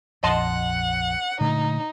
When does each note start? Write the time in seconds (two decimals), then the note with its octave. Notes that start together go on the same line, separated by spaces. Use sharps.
0.24 A#1 F2 D#5 F#5 A5 C6
1.41 A#2 D3 A3 D#4